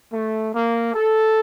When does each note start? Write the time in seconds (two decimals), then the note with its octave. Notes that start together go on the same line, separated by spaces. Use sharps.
0.12 A3
0.54 A#3
0.94 A4